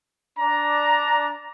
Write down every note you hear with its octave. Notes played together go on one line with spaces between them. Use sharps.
D4 A#5